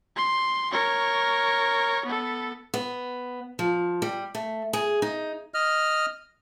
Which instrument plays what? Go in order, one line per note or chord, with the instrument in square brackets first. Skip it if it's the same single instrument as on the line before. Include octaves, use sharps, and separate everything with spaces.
[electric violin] C6
A#4 C#5
B3 A4
[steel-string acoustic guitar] B3
F3
G3
A3
G#4
D#4
[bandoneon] D#5 F6